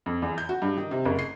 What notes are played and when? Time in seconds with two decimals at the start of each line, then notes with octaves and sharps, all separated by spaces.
0.06 F2
0.22 E2
0.38 G6
0.49 F#4
0.62 G2
0.78 D#3
0.91 C3
1.05 F#1
1.19 C7